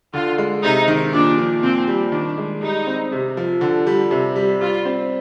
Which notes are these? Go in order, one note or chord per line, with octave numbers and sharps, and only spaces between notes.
D3 F4
G#3
C3 D#4
D#3
A#2 D4
F3
A#2 C4
G3
D#3 D4
G#3
G3 D#4
C4
C3
F3
D3
G3
C3
G3
G3 F4
C4